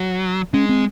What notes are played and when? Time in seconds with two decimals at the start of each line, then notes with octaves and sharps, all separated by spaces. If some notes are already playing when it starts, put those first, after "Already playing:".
Already playing: F#3
0.54 G#3 C#4
0.69 C4